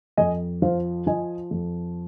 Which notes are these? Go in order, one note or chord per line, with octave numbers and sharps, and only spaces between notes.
F2 D#5 G#5
F3 C5 F5
F3 D#5 G#5
F2